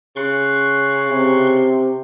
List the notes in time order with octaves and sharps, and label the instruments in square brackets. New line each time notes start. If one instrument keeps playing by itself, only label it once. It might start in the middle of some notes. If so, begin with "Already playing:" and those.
[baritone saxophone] C#3 [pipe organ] C6 C#6 F#6
[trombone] C3